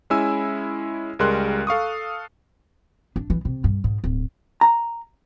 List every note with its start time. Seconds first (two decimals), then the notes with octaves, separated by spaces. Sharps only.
0.10 G#3 C#4 E4 G#5 E6
1.19 C#2 G3 G#3 A#4 C6 F#6
1.67 A4 F5 C#6 D#6
3.16 D4
3.30 E3
3.45 C3
3.64 G2
3.84 G#2
4.04 D1
4.61 A#5